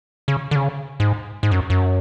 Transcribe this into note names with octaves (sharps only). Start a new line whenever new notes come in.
C#3
D3
C#3
G#2
G#2
F#2
F#2